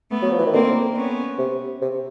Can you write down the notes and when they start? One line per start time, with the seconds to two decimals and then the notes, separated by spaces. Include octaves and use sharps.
0.10 A3 B3
0.22 F#3
0.31 F3
0.39 E3
0.46 D#3
0.54 D3 A#3 C4
0.96 B3 C#4
1.39 C3
1.82 C3